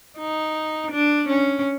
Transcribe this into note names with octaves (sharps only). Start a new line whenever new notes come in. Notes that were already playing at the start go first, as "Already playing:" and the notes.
D#4
D4
C#4